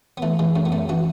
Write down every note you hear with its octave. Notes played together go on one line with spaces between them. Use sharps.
B3
E3 A3
E3 G#3
F#2 A3
B3
F#2 A3
E3 F#4